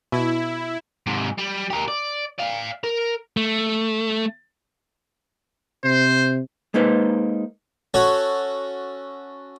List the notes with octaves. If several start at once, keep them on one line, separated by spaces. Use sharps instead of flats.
B2 E4
G#2 C3
G3
G4 A#4
D5
D5 F5
A#4
A3
C3 C5
G#3 A#3 D#4 B4 C5
C#4 F#4 A4 C#5